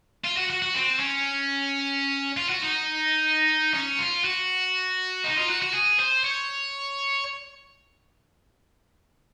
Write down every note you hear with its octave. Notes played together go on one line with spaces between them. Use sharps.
F4
F#4
F#4
F#4
C4
C#4
F4
F#4
D#4
C#4
F4
F#4
D#4
F4
F#4
F#4
G#4
C5
C#5